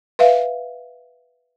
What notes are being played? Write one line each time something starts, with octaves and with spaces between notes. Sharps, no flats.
B4 E5 F5